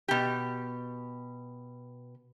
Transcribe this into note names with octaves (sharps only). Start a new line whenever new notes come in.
B2 G4